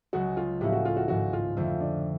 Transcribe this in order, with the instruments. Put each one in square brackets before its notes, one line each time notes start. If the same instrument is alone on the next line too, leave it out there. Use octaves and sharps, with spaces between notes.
[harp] C#2 C#3 F#3 [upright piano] F#4
[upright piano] F4
[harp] A2 F3 A#3 C#4 E4 [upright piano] G4
[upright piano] F#4
F4
F#4
[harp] G#1 G#2 F3 [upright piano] F#4
[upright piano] F4
[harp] F2 D3 F3 A3 C4 [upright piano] F4
[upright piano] D4